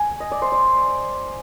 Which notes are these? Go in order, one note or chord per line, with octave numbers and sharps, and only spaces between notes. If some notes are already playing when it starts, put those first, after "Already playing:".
Already playing: G#5
D#5
D5
C5
D5